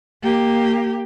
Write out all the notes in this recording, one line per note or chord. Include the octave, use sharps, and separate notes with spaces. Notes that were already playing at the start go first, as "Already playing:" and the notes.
A#3 G4